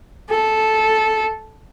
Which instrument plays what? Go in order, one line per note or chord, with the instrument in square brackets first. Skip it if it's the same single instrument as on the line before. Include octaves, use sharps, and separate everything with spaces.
[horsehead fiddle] A4